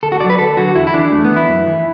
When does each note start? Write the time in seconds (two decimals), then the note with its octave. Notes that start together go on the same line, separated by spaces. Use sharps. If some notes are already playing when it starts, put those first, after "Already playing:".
0.03 D2 A4
0.12 F#4
0.20 D3 F#3 D5
0.30 B4
0.39 D2 A4
0.57 D3 F#3 F#4
0.75 E2 E4
0.87 E4
0.94 E3 D4
1.12 E2 A3
1.25 B3
1.31 E3
1.36 E4
1.49 F#2
1.67 E3